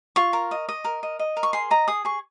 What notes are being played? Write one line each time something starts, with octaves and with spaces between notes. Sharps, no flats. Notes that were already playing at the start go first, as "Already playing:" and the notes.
F4 C#6
A#4
D#5
D#5
A#4
D#5
D#5
A#4
C#6
G#4 C6
D#5 A#5
G#4 D#6
G#4 C#6